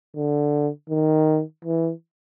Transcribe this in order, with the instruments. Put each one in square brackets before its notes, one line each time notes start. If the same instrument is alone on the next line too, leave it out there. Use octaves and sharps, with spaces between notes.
[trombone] D3
D#3
E3